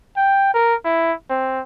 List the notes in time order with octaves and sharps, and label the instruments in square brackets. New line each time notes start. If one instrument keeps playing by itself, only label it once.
[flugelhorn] G5
A#4
E4
C4